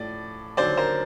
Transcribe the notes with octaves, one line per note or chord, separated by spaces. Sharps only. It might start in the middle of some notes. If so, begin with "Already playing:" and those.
Already playing: A2 F3 D5
D#2 D3 F#3 C5 D5
A#4 C5